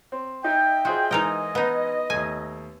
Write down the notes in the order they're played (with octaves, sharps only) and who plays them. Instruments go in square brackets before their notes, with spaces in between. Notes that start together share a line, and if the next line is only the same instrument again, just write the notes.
[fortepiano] C4
[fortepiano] D#4 [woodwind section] D#5 E5 G5
[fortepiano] F4 G#4 C5 [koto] F#4
[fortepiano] G#2 E3 [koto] D#4 A#4 G5 [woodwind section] D#5
[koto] B3 D#4
[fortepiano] D#2 A3 [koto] G#5